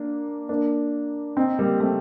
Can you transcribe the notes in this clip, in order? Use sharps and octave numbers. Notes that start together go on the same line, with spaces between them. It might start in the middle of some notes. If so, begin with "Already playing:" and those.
Already playing: A#3 D4
A#3 D4
C4 D#4
G3 A#3
A3 C4